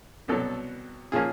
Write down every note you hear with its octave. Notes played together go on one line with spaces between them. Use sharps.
C2 B2 F#3 A4
A#2 F3 A#3 C#4 G#4